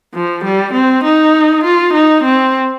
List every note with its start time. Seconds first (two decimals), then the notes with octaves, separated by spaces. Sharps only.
0.14 F3
0.44 G3
0.74 C4
1.04 D#4
1.64 F4
1.93 D#4
2.24 C4